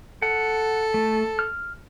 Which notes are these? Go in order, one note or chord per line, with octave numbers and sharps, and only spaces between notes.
A4 F#5
A3
F6